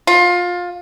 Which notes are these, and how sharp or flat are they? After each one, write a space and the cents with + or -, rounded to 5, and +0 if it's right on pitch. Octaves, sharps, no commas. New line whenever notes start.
F4 +20